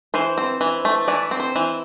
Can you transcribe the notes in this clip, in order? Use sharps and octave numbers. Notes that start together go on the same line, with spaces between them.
E3 C5
C4
E3
A3
E3 D5
C4
C5
E3